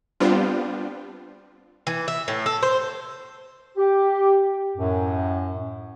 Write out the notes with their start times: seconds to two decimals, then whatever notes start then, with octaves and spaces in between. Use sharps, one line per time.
0.20 G3 B3 C4 D4 F4
1.87 E3
2.08 E5
2.28 A2
2.46 A4
2.63 C5
3.78 G4
4.76 F#2 A2